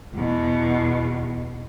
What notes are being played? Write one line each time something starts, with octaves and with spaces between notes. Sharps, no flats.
E2 B2